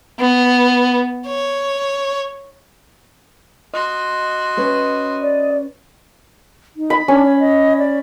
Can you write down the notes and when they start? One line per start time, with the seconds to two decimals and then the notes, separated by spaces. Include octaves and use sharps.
0.20 B3
1.27 C#5
3.74 F#4 D#5 C6
4.57 C#4 B4 C#5
5.22 D5
6.77 D#4
6.90 B5
7.08 C#4 D4
7.25 C#5
7.40 D#5
7.78 D5